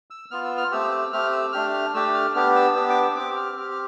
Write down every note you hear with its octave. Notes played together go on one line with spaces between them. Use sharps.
E6
B3 F4 F6
E6
F6
A3 C4 G4 E6
E6
A3 C4 G4 F6
E6
A3 D4 G4 F6
F6
A3 D4 G4 E6
F6
B3 D4 G4 F6
E6
B3 D4 G4 E6
D6
E6
C4 G4 D6
F6
C4 G4 F6
F6